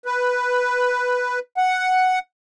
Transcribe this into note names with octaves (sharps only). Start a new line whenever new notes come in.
B4
F#5